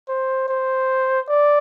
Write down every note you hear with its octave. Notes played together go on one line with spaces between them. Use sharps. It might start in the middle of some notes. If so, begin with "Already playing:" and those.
C5
C5
D5